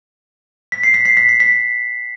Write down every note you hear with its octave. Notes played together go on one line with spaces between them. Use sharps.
B6
C7
B6
C7
B6
C7
B6